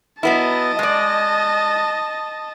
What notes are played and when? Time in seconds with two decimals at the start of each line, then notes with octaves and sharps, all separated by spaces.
0.23 F#3 B3 E4 D#5 A5
0.79 G#3 D5